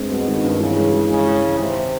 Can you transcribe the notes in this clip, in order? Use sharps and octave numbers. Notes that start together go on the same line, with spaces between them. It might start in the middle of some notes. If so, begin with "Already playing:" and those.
Already playing: G2 G#3 C4
B2 G#3
D#3
G2
C#3 E3
G#3
E3
C#3 G#3
E3
G#3
C3 D#3